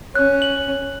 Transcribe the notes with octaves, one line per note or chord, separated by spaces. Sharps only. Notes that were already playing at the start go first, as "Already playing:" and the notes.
C#4 F#6
F#7